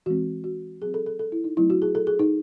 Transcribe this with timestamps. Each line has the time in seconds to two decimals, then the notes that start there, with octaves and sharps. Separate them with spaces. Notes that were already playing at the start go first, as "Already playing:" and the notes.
0.06 E3 G#3 C4 F#4
0.44 F#4
0.81 F#3 G#4
0.85 C4
0.94 A4
1.06 A4
1.19 A4
1.32 E4
1.44 D#4
1.57 F#3 A3 C4 E4
1.70 F#4
1.82 G#4
1.95 A4
2.07 G#4
2.19 D#4